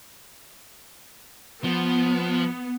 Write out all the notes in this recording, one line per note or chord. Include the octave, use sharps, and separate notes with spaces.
F3 B3